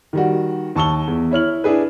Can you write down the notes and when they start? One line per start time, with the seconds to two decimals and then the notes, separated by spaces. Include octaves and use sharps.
0.13 D#3 G3 F#4
0.76 D#2 A5 C#6 E6 G7
1.07 E2
1.31 E4 C#5 F6 F#7
1.64 D4 E4 G#4 B4